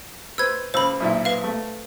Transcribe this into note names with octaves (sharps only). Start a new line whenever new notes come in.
B4 C5 E6 G#6
C#2 C5 B5 E6
B1 A#2 E4
B4 F5
A3